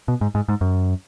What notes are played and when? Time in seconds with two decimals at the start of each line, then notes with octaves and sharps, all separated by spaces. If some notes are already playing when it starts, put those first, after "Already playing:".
0.08 B2
0.21 G#2
0.35 G#2
0.49 G#2
0.61 F#2